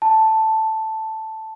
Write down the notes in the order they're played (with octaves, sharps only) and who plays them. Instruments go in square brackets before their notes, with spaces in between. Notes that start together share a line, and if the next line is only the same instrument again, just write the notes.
[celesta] A5